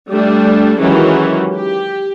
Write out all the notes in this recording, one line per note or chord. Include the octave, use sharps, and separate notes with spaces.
G3 A3 D4
D#3 E3 F#3 G#3 C#4 G4
G4